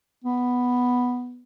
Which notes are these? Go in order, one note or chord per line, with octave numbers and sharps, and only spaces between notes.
B3